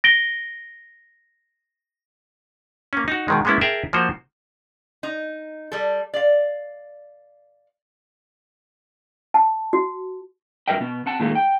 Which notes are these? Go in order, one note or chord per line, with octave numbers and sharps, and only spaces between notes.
A#6 D7 G7
A#3 C#4
D#4 F#4
B2 D#3 G#3
G#3 A#3 B3 C#4 E4
G#4 A#4 E5 G5 A5
F3 A#3 F4 F#4 C5
D#4
G3 A4
D5 F5
A5
F#4
G2 F#3 A#4 D#5 E5 G5
B2 B3
C4 F#5 A5
A#2 D#3 G#3 A3 F4
G5